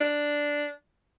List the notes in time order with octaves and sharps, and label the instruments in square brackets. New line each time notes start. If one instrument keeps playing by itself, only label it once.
[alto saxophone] D4